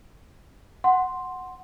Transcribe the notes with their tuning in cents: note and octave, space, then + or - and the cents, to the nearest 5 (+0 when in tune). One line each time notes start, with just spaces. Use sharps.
F#5 +0 C6 +0